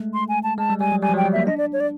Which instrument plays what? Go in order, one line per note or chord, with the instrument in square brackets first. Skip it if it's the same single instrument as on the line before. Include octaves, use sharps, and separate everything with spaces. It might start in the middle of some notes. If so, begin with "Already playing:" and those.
Already playing: [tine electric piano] G#3 A3
[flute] C6
G#5
A5
[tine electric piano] G#3 [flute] A5
[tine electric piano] G3
[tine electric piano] G3 [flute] G#5
[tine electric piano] F#3
[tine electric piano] G3 [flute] G#5
[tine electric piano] F3
[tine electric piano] F#3 [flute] G5
[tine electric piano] G3
[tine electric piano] A#3 [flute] E5
[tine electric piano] D4 [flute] D#5
[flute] D5
C#5
D5